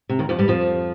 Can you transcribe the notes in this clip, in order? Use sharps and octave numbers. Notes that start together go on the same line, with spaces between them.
C3
D#2 D#3
F2 F3
G2 G3
F2 F3